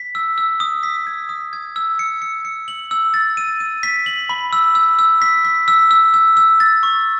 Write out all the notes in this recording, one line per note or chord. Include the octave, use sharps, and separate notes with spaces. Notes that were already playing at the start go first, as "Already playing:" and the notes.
Already playing: B6
E6
E6
D#6
B6
G#6
D#6
G#6
E6
C#7
C#7
C#7
F#7
E6
A6
D#7
D#7
B6
F#7
B5
E6
E6
E6
B6
B6
E6
E6
E6
E6
A6
C#6